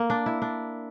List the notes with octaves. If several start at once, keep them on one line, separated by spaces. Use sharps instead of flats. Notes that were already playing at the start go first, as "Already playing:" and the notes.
Already playing: A#3
D4
E4
D4